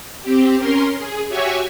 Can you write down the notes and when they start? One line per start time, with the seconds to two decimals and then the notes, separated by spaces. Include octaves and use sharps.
0.23 C4 G4
0.58 C#4 A#4 C6
0.97 G#4
1.29 F#4 G4 C#5 E5 G#5 C#6